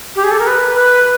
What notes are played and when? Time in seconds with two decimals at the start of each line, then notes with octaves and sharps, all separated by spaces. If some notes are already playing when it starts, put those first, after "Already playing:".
0.16 G4
0.24 G#4
0.31 A4
0.39 A#4
0.47 B4
0.75 B4